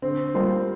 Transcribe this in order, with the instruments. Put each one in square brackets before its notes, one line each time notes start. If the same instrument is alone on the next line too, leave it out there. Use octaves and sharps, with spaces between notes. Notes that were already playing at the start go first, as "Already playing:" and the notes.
[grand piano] D3 [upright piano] C4
[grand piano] G3 A#3 F4 C5